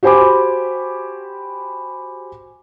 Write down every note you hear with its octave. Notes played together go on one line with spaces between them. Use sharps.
F#4 G4 C5 G#5 B5 D6